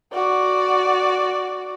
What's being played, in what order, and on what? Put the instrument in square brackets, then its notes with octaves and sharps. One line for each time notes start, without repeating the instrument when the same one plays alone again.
[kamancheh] F#4 D5